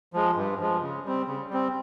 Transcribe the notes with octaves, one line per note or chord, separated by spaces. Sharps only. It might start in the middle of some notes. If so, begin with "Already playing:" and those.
F3 G#3
G2
F3 G#3
C#3
G3 C4
C#3
G3 C4